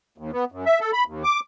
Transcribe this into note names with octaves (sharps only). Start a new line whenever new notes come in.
D#2
B3
F#2
E5
A4
B5
D#2
D6